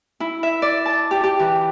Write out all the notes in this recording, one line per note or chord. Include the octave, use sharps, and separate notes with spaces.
E4
E5
D5
A5
G4
G4
E3